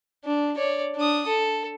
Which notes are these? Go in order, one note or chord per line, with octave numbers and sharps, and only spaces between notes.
D4
C#5 D5
D4 D#6
A4